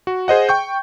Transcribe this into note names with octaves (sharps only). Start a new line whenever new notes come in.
F#4
G#4 C5 D#5 F#5
G5 C#6 G6